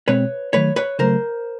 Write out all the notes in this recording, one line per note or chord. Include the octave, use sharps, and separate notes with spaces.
B2 G#3 C4 B4 C#5
D#3 F#3 A3 B4 C#5
B4 C#5
C#3 F#3 A3 A#4 C5